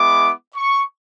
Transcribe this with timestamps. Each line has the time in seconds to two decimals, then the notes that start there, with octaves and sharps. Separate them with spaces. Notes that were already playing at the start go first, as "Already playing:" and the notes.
Already playing: G#3 B3 E4 D6
0.55 C#6